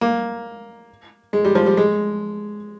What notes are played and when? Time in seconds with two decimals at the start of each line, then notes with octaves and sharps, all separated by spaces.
0.01 A#3
1.33 G#3
1.45 G3
1.55 F3
1.66 G3
1.77 G#3